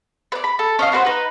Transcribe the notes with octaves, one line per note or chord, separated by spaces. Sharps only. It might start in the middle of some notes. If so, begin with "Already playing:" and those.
B4 D5
B5
A4
C#4 D#5 F5
B3 F#4 B4 C5
D#4 B4